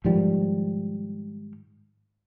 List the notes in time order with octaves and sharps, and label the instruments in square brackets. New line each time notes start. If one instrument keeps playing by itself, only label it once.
[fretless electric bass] G#2 D#3 F3 G3